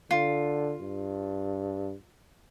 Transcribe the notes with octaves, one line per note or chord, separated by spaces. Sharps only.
D3 F4
G2